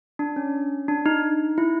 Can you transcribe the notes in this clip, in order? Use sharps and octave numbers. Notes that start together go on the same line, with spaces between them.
D4
C#4
D4
D#4
E4